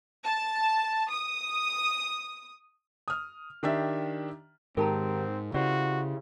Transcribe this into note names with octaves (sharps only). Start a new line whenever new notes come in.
A5
D#6
D#6 F6
D#3 D4 G4 E5
G#2 D#3 C4 G4 A#4 G5 A5 A#5
C#3 E4 F#4 G4 C5 D5